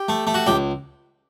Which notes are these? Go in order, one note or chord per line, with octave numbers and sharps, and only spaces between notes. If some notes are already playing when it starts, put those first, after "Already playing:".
Already playing: G4
A3
A3
F#4
C#2 G4